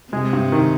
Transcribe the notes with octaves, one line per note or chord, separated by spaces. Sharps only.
C3 G#3
G2
D#3